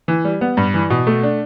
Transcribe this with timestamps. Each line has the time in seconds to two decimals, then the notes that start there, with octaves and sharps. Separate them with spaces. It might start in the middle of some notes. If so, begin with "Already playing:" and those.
0.08 E3
0.25 G3
0.41 B3
0.57 G2
0.74 E3
0.90 B2
1.07 A3
1.23 D4